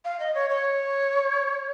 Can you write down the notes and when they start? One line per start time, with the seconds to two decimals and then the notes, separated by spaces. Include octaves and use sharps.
0.05 F5
0.20 D#5
0.35 C#5
0.50 C#5